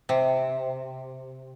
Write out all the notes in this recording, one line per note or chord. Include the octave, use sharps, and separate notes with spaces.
C3